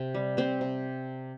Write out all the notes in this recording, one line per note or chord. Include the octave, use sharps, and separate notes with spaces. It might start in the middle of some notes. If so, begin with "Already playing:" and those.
Already playing: C3
G3
C3 C4 C5
C3